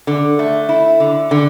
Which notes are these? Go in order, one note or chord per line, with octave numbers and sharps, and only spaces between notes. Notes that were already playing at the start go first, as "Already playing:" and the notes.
D3
A3
E4
D3
D3